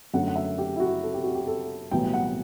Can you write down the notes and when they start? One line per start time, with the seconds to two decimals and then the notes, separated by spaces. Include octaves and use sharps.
0.14 F#2 D3 A3 F#5
0.28 F#5
0.36 E5
0.58 G4
0.76 E4
0.80 F#4
1.03 A4
1.14 G4
1.24 F#4
1.35 G4
1.47 A4
1.91 B1 A2 E3 G3 G5
2.14 F#5